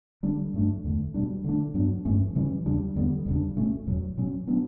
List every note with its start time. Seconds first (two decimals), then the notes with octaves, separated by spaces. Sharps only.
0.23 D3 G3 D4
0.54 G2 F#3 A3 D4
0.84 E2 D3 A3
1.14 B2 G3 D4
1.44 D3 A3 D4
1.74 G2 F#3 B3 D4
2.05 G2 E3 A3 C#4
2.35 C#3 E3 G3 C#4
2.66 E2 C#3 G3 D4
2.96 E2 D3 G3 B3
3.26 E2 C#3 G3 D4
3.57 B2 A3 C#4
3.87 E2 B2 F#3
4.17 B2 F#3 C#4
4.47 F#3 B3 D4